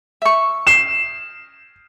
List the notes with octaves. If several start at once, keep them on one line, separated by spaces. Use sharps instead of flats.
E5 C#6
C7 E7